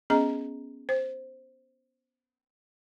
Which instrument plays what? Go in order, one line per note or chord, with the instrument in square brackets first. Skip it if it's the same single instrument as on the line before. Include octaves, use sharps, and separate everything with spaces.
[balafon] B3 C#4 G#4 D#5 A#5
C5